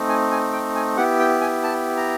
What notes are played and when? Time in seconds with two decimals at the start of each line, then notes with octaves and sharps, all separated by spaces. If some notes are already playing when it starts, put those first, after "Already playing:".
Already playing: A3 C4 D#4
0.08 G#5
0.31 G#5
0.52 G5
0.76 G#5
0.97 B3 E4 G4 F#5
1.19 G5
1.41 G#5
1.63 A5
1.97 A#5